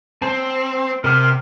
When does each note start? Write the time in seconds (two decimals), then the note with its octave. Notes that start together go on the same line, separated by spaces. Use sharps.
0.22 C4 C5 A5
1.04 C3 A#4 F6